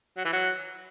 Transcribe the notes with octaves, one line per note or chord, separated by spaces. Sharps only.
F#3
E3
F#3